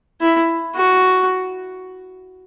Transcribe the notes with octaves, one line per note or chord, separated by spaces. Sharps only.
E4
F#4